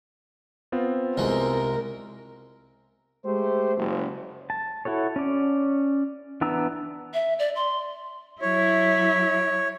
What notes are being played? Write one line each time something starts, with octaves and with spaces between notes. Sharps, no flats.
B3 C4 F4
C2 G#3 A#4
G#3 A3 G4 C5
F#1
A5
E4 F#4 A4 C#5
C#4 D5
E3 B3 D4 A#5 E6
E5
D5
C6
F#3 E4 C#5